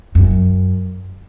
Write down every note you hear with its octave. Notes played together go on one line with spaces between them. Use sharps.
F#2